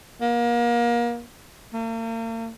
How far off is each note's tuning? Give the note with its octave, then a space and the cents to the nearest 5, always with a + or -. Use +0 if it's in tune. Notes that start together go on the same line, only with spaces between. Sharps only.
A#3 +30
A#3 -40